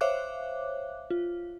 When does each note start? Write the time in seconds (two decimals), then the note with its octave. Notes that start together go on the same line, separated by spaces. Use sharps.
0.01 C5 C#5 E5 F5 D6 F#6
1.10 F4